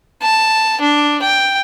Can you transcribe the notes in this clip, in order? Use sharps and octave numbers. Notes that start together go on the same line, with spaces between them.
A5
D4
G5